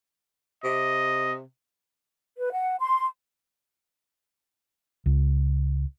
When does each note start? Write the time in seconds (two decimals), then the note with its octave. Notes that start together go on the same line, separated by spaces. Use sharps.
0.64 C3 D#5
2.39 B4
2.53 F#5
2.79 C6
5.06 C#2